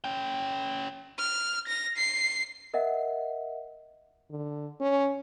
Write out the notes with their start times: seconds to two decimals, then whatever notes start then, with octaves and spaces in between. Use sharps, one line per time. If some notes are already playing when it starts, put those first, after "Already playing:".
0.04 C#4 G5
1.19 F6
1.68 A#6
1.97 C7
2.74 A#4 D#5 E5 F#5
4.31 D3
4.81 C#4